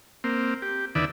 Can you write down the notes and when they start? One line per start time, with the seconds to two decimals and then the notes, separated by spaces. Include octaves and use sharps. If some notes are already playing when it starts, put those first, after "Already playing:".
0.24 A#3 C4
0.62 G4
0.95 E2 D3 D#3 B4 D5 E5